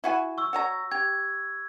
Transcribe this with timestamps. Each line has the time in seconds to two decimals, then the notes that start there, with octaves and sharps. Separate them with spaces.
0.04 E4 F#4 G#5
0.38 C#6 E6
0.53 F#4 C#5 A#5
0.92 G4 G#6